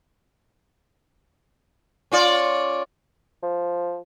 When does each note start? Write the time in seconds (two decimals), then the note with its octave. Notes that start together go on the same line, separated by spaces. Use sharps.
2.12 C#4 F4 D5
3.43 F3